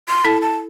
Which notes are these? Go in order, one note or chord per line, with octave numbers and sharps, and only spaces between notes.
C6
E4 A4 A5
A5